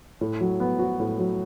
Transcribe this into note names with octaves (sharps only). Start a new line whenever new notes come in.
A2
F#3
B3
F#4
A2
F#3